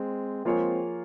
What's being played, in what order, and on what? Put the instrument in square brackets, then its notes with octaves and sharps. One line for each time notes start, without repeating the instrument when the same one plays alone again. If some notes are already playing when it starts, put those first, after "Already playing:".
Already playing: [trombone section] G#3 C4
[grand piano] F3 A#3 F4 G#4 C#5 [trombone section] G#3 C4